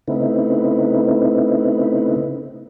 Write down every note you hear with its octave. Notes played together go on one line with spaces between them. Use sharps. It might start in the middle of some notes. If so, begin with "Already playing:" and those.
C#3 A3 B3 C4 D#4 E4